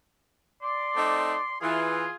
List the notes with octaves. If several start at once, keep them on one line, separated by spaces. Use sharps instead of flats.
D5 C6
A3 C4 D#4
E3 F4 G#4